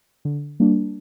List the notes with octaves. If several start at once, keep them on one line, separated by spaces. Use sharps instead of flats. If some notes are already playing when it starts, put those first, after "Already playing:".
D3
G3 A#3 D4